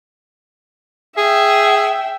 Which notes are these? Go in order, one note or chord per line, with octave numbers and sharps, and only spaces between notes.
G#4 E5 G5